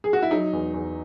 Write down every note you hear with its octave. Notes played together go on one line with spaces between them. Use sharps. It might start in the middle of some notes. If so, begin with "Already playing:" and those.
G#4
F#4
E4
F#3 D#4
E2
E2